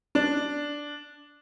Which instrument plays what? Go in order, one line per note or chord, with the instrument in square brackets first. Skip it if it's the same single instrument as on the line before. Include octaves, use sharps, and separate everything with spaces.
[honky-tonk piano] D4